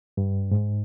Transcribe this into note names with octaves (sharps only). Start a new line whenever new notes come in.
G2
G#2